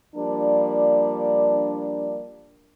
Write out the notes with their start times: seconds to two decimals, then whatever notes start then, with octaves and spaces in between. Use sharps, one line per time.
0.16 F3 G3 A#3 D4